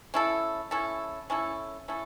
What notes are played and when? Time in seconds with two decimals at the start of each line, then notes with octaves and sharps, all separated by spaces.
0.14 C#4 E4 A4
0.71 C#4 E4 A4
1.30 C#4 E4 A4
1.88 C#4 E4 A4